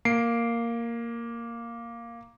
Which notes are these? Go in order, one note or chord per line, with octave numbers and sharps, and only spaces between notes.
A#3 C7 D7